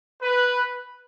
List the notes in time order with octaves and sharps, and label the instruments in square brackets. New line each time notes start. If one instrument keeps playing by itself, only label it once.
[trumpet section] B4